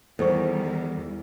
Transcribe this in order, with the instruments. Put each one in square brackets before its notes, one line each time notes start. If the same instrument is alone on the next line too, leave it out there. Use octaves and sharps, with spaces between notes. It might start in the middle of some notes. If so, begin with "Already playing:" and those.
[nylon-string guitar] E2 [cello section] D#3 G3 [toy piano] A4 C5 C#6